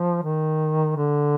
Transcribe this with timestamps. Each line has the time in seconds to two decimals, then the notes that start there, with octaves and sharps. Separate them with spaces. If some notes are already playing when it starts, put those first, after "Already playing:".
Already playing: F3
0.23 D#3
0.97 D3